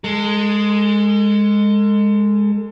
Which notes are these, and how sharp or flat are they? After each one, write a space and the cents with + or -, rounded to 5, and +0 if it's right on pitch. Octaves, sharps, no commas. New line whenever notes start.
G#3 +0 A4 +35